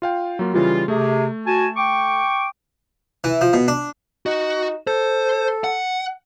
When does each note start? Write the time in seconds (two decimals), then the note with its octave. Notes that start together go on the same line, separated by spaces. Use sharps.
0.02 F4 F5 G5
0.39 F#3 A#3 F4
0.54 C#3 E3 G3 F4
0.88 C3 A3 G#4
1.47 F#4 G#5 A5
1.76 G5 C#6 D6
3.24 E3
3.41 F3
3.53 B2
3.68 D4
4.26 D#4 F#4
4.87 A4 C5
5.64 F#5